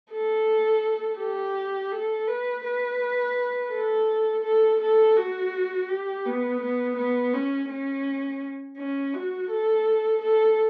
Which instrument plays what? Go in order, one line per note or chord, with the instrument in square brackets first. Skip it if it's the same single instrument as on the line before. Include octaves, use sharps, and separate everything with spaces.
[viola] A4
G4
A4
B4
B4
A4
A4
A4
F#4
G4
B3
B3
B3
C#4
C#4
C#4
F#4
A4
A4